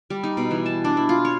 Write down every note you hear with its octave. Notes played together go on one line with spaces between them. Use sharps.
G3
D#4
B2
E3
A5
D4
E4
F4
C#5